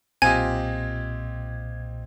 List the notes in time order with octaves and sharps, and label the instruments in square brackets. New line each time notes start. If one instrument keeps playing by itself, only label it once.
[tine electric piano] B1 A#2 D#5 [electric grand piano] C4 F4 G4 [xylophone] G#5 [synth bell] G#6